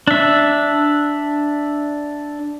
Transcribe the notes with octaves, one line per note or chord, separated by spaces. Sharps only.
D4 E5